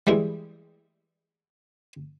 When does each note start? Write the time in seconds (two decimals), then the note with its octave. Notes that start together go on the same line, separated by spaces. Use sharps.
0.07 E3 G3 G#3 E4